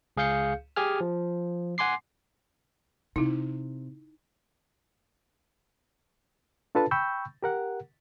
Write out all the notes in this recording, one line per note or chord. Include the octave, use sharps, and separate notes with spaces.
C#2 G#4 F5 G6 C#7
G4 G#4 G#5 F6
F3
F#5 G#5 C6 D6 C7
C3 D#4 E4
D4 F4 A4 B4 A5
G5 B5 C#6 E6 G6
G4 A#4 F#5